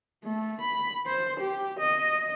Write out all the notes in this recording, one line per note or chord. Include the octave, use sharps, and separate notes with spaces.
A3
B5
C5
G4
D#5